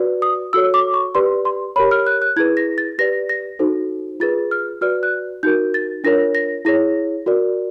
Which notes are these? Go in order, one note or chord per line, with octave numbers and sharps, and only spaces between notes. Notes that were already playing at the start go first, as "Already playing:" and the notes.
Already playing: F#4 B4 D5
D#6
F#4 A4 C#5 E6
D6
C#6
G4 B4 D5 C6
C6
G4 A#4 C#5 B5
F6
F#6
F#6
E4 G#4 B4 G#6
A#6
A6
G4 B4 D5 A#6
A#6
D#4 F#4 A4 C5
F4 G#4 B4 A6
F6
F#4 B4 D5 F6
F#6
D#4 F#4 A#4 G6
A6
D4 F4 A#4 C#5 A#6
A#6
E4 G#4 C#5 A#6
F#4 A#4 D5